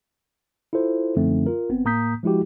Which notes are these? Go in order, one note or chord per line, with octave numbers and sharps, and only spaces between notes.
E4 F4 A4 C5
F#2 D3 F3 A3 C4 D#4
F4 A#4
G1 B3 C4
A2 A#3 A#5 D#6 G6 B6
F3 G#3 E4 F#4 G4